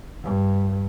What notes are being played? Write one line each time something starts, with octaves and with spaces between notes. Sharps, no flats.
G2